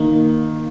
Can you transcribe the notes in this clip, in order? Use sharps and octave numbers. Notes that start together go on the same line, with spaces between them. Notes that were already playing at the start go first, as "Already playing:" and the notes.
Already playing: D#3 A#3